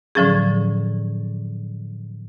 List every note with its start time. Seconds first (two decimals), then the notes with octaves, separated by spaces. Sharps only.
0.15 A2 D3 F3 F#3 C#4 G#4